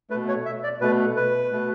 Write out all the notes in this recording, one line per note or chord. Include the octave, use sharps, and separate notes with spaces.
B2 A3 B4
C#5
E5
D5
B2 A3 B4
B4
B2 A3